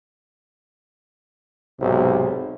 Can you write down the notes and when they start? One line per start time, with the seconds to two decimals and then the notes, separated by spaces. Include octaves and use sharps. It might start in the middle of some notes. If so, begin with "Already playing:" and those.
1.80 B1 G#2 C3